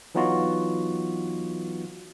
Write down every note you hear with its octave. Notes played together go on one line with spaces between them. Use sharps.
E3 F#3 B3 D#4 F4 F#4